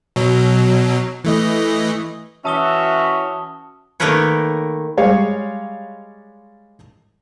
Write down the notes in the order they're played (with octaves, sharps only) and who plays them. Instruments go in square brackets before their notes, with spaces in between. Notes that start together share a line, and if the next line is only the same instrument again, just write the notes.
[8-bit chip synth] B2 F#3
E3 A3 D#5
[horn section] E3 C#4 F#4 [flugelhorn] E5 [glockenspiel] A5 D#6 G7
[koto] D#3 A3 A#3 A#4 B4 C#5
[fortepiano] G3 G#3 C#5 F5